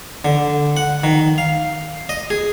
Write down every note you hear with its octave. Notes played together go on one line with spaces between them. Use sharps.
D3
F#5
D#3
F5
D#5
G#4